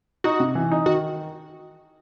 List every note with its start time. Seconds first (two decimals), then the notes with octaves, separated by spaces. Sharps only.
0.24 D#4 F#4
0.40 C3
0.55 E3
0.71 D#4
0.86 D#3 F#4